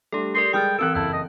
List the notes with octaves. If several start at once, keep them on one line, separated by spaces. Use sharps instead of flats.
G3 A3 D4 G4 A4
G4 A#4 D5 C6
G3 G#3 G5 D#6 F6 A6
E3 C4 A4 A#4 E6 F#6 D7
F#1 E4 A5 G6
D#5